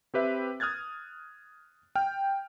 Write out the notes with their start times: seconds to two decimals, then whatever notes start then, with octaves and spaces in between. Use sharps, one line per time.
0.14 C4 G4 B4 E5
0.60 D#6 F6 F#6 G#6 A6
1.95 G5 F6